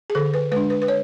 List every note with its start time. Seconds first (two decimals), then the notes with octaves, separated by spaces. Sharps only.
0.10 G#4
0.15 D3 A4
0.34 B4
0.52 G#3 B4
0.56 D4
0.70 B4
0.82 B4
0.88 C#5